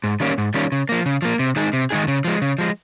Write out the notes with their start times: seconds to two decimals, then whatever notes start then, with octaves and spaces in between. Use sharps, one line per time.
0.04 G#2
0.20 D#3 G3 A#3 C#4
0.38 G#2
0.54 D#3 G3 A#3 C#4
0.72 C#3
0.89 F3 A#3
1.06 C#3
1.22 F3 A#3
1.39 C3
1.56 D#3 G#3 D#4 G#4
1.73 C3
1.90 D#3 G#3 D#4 G#4
2.08 C#3
2.25 F3 G#3
2.42 C#3
2.58 F3 G#3